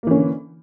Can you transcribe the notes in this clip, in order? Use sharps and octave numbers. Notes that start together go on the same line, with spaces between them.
D3 E3 A#3 C#4